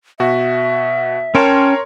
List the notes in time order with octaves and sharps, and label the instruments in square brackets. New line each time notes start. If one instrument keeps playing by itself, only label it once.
[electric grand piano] B2 F#4 [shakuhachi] E5
[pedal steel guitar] C#4 G5 A5 [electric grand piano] A#4 C#5 C6